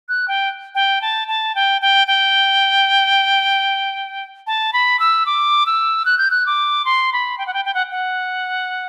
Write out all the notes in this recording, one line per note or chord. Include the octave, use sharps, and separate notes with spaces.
F#6
G5
G5
A5
A5
G5
G5
G5
A5
B5
E6
D6
E6
F#6
G6
F#6
D6
C6
B5
G5
F#5
G5
G5
F#5
F#5